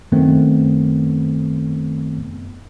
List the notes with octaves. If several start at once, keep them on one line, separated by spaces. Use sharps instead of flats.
F#2 D#3 A3 B3 C4